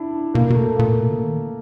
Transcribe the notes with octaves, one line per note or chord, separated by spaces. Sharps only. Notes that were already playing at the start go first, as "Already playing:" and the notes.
Already playing: D4 E4
B2 A#3
B2 A3
A#2 A#3
B2
D3
D#3